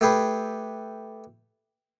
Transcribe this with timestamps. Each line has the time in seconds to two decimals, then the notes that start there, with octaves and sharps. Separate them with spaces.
0.01 A3 G4 G#4 B4